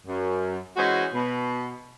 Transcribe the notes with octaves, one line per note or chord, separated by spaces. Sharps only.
F#2
E3 G#3 C#4 F#4 C5 D#5
B2